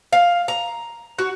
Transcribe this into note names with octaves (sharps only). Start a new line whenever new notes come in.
F5
A#5
F#4